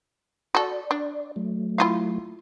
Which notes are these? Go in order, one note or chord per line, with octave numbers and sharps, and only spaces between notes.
F#4 A4 D5
D4
F#3 A3
E4 F4 F5